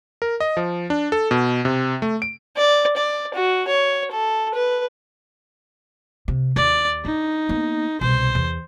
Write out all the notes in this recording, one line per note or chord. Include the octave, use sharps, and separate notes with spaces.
A#4
D#5
F3
D4
A4
B2
C3
A3
D7
D5
D5
F#4
C#5
A4
B4
C3
D#2 D5
D4 D#4
A#3 B3
C2 B2 C5
E2